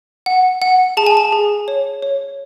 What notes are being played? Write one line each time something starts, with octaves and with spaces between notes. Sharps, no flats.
F#5
F#5
G#4 A5
G#5
A5
G#4
C#5
C#5